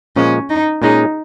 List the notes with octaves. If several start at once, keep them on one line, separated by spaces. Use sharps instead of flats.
A#2 F3 G#3 C#4
D#4
A#2 G#3 C#4 D#4 G#4